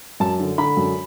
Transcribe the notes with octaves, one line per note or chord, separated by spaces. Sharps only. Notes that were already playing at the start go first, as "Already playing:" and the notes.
F#2 A5
D3
D3 B5
F#2